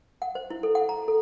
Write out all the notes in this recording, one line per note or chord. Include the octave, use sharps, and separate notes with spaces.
F#5
C5
E4
A4
F#5
A#5
A4